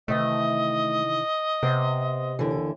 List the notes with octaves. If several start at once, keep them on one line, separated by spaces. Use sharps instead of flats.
C3 D#3 E3 A3 D#5
C3 B3 C5
D#2 D3 E3